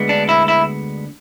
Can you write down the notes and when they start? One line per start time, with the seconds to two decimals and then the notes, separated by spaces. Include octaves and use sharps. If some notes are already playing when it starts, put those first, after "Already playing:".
Already playing: D2 D3 G#3 B3
0.09 D4
0.29 E4
0.48 E4